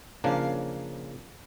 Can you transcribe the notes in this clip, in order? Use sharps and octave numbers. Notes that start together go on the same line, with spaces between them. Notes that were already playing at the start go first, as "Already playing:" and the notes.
C#3 F3 A#3 D4 F5